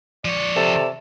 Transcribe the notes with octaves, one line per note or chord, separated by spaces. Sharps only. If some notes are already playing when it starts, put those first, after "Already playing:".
F3 C#5 D5
C3 A4